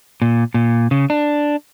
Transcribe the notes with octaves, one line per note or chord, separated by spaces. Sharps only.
A#2
A#2
C#3
D4